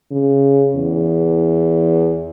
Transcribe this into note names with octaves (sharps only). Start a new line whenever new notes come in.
C#3
E2